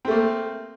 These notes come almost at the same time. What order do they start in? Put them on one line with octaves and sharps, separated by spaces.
C4 A3 A#3